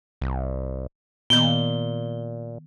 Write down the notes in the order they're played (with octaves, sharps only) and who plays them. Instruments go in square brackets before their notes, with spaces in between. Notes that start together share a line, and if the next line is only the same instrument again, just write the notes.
[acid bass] C2
[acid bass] A#2 [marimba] D#3 B3 [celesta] G7